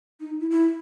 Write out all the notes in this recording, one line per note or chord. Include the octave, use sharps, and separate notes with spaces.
D#4
E4
E4